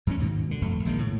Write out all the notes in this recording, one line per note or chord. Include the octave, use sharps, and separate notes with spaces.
F#2 E3 B3 C#4
D#2 G#2 B2
B2 D3
G1 F2 A3
A#1 D#3 G#3 A#3
A2 C#3